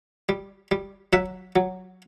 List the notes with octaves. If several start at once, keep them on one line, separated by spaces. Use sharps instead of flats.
G3
G3
F#3 E5 F#5
F#3